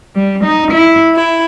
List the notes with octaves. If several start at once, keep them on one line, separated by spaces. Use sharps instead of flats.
G3
D#4
E4
E4